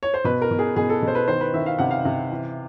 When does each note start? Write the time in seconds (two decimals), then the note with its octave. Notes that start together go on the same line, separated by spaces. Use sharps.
0.03 C#5
0.14 C5
0.24 B2 B4
0.42 A#4
0.51 B2
0.59 G#4
0.76 B2 G#4
0.89 A4
1.02 B2
1.08 C5
1.15 B4
1.28 D#3 C5
1.41 B4
1.54 D#3 E5
1.66 F5
1.79 C3 F#5
1.91 F5
2.05 C3
2.31 E3